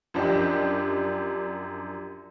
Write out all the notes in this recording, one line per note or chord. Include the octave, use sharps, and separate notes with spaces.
F#2 F3 D4 G4 D#5